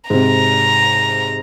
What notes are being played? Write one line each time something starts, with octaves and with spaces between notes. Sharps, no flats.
G#2 C3 A#5